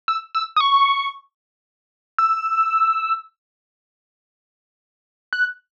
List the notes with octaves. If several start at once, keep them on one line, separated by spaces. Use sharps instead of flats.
E6
E6
D#6
C#6
E6
F#6